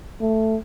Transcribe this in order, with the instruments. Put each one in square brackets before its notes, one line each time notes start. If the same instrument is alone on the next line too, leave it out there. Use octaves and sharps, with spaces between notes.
[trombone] A3